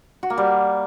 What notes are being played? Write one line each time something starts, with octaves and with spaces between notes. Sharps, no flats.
F#4
A#3
G3